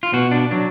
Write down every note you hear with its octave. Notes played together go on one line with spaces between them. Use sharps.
F4
B2 F#4
D4
F#3 D4